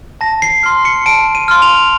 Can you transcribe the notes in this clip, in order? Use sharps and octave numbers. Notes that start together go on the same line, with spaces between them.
A5 A#6
C7
C6 F6 C7
C#7
A5 D7
D#7
C6 F6
F7